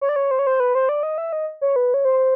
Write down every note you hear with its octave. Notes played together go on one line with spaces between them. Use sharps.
C#5
D5
C#5
C5
C#5
C5
B4
C5
D5
D#5
E5
D#5
C#5
B4
C#5
C5